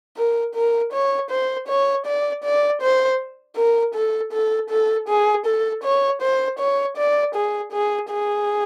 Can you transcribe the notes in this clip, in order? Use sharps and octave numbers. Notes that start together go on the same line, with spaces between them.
A#4
A#4
C#5
C5
C#5
D5
D5
C5
A#4
A4
A4
A4
G#4
A4
C#5
C5
C#5
D5
G#4
G#4
G#4